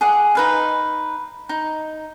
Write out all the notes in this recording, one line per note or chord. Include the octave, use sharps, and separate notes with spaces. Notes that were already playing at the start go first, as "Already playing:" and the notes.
G#4 D5 F#5
D#4 B4 F5
D#4